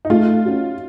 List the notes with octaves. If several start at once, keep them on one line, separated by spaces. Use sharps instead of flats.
D#4
A3 F4
C#4 F#4